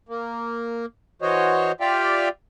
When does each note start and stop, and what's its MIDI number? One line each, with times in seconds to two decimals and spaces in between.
0.09 0.86 58
1.22 1.72 52
1.22 1.72 66
1.22 1.72 72
1.22 1.72 73
1.22 1.72 75
1.81 2.29 65
1.81 2.29 67
1.81 2.29 74
1.81 2.29 76
1.81 2.29 77
1.81 2.29 79